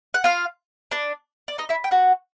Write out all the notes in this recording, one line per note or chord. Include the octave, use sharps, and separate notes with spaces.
F#5
F4 F5
D4 D5
D5
D#4 D#5
E4 E5
G5
F#4 F#5